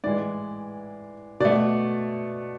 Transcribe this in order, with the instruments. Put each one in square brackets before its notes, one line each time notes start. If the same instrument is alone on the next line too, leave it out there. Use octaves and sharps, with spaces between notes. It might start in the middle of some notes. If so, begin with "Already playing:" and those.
[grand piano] A2 E3 G#3 D5
B2 A3 D5